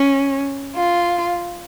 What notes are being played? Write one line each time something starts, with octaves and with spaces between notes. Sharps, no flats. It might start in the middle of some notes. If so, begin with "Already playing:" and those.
Already playing: C#4
F4